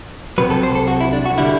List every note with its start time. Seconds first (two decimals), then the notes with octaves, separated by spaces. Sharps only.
0.38 C2 C3 F#3 B4
0.50 A4
0.63 C5
0.75 A4
0.88 F#4
1.01 E4
1.13 D4
1.26 F#4
1.38 D3 G3 E4